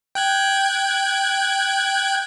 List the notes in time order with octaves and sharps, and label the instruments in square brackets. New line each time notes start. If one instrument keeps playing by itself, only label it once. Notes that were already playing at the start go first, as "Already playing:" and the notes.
[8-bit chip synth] G5 F#6 G#6